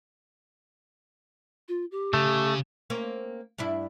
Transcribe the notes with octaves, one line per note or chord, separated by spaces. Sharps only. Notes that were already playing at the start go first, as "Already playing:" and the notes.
F4
G4
C#3 A3
A#3 C4 C#4
G2 D4 E4